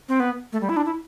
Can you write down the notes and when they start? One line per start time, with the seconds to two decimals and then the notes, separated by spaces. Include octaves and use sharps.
0.09 C4
0.20 B3
0.53 A3
0.61 G3
0.69 E4
0.77 D4
0.86 E4